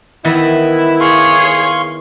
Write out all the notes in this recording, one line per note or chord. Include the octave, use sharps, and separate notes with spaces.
D#3 E3 B3 E4
G#4 C#5 F5 C6 C#6